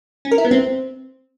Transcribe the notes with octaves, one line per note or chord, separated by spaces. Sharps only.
C#4
A#4
E4
B3
C4